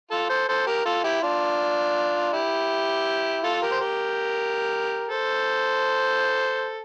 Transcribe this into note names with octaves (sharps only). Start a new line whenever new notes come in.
F4 A4
A4 C5
A4 C5
G4 A#4
F4 A4
E4 G4
D4 F4
E4 G4
F4 A4
G4 A#4
C5
G4 A#4
A4 C5